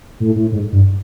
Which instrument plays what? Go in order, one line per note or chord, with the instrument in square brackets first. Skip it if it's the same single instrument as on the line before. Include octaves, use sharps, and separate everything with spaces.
[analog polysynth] A2
A2
G#2
G2